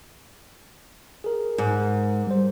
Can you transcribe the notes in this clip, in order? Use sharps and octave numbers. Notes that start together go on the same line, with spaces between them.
G#4 A#4
G#2
G3 C5